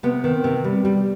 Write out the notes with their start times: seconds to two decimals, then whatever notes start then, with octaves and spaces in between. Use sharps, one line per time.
0.03 C3 B3
0.24 D#3
0.44 C3
0.64 G3
0.85 G3